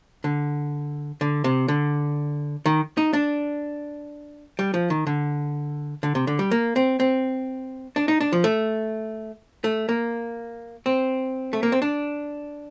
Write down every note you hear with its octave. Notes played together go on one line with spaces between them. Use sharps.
D3
D3
C3
D3
D#3
D#4
D4
G3
F3
D#3
D3
D3
C3
D3
G3
A#3
C4
C4
D4
D#4
D4
F3
A3
A3
A#3
C4
A3
A#3
C4
D4